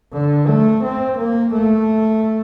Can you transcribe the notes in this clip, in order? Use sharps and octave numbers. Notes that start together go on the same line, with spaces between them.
D3
A3
C4
A#3
A3